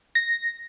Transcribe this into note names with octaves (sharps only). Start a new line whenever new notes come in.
A#6